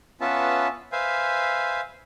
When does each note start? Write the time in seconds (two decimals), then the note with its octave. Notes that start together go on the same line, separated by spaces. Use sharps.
0.21 B3 C#4 F4 B4 E5 A5
0.92 B4 C5 E5 F5 G#5